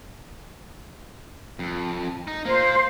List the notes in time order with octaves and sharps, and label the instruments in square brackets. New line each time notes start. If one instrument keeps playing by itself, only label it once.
[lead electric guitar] F2
D#4
[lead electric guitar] A#3 F4 [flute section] C5